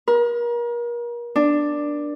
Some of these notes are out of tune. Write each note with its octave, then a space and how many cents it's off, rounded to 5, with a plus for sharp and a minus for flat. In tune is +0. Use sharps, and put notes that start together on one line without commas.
A#4 +35
D4 +5